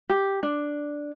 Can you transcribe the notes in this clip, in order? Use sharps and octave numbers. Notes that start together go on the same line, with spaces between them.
G4
D4